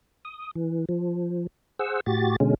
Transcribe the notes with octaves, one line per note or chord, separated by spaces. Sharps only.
D#6
E3
F3
G#4 C5 F#5 E6
A2 F#4 G4 A6
B2 D3 G#3 C#4